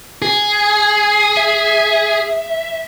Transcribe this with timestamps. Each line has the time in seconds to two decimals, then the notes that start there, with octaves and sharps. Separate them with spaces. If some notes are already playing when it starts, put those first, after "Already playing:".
0.22 G#4
1.37 E5